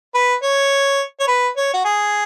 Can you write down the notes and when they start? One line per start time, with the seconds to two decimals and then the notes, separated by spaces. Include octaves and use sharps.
0.14 B4
0.42 C#5
1.20 C#5
1.28 B4
1.57 C#5
1.74 F#4
1.85 G#4